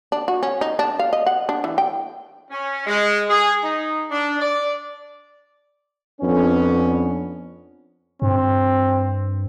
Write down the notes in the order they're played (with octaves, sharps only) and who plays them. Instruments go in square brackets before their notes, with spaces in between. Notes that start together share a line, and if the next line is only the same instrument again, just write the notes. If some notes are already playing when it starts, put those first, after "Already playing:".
[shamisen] D4
F#4
C#4
D#4
D4
F5
D#5
F#5
D4
E3
G5
[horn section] C#4
G#3
G#4
D#4
D4
D5
[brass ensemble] F2 B3 C#4 D4
[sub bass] G2 [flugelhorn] C4